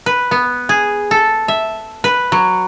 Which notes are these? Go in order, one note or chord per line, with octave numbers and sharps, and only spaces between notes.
B4
B3
G#4
A4
E5
B4
F#3